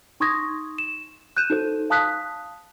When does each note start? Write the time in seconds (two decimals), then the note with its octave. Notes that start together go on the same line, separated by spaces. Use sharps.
0.20 D#4 C6 C#6 D#6 G#6 A#6
0.78 E7
1.37 F#6 G6 D#7 E7
1.50 D#4 F#4 A4 C5
1.90 F5 A5 D#6 F#6 B6